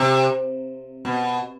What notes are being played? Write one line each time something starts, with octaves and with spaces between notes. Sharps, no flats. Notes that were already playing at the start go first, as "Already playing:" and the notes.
Already playing: C3
B2